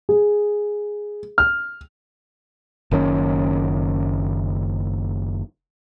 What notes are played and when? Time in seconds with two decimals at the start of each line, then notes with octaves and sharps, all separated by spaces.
0.09 G#4
1.38 F6
2.91 F#1 D#3 C4 C#4